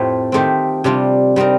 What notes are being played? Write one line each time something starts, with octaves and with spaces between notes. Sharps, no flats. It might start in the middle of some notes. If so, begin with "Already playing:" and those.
Already playing: F2 A2 A3 C4 F4 G4 C5
D#3 A3 C4 G4 C5
C3 G3 D4 F4
G3 C4 D#4 A#4